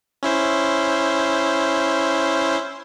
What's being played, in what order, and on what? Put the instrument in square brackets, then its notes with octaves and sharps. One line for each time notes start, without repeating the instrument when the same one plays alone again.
[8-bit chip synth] C#4 E4 C5